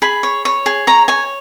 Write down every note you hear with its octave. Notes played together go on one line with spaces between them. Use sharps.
G#4 B5
C#5
C#5
G#4
C#5 A#5
C#5 G#5